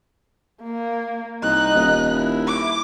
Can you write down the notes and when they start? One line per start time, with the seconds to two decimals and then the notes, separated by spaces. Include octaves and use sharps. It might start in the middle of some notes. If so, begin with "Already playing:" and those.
0.63 A#3
1.43 C2 D#4 F#6
1.75 D#1
2.11 E4
2.47 D6